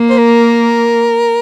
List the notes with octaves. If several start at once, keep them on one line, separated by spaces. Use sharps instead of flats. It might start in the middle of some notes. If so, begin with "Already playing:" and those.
Already playing: A#3
C5
A#4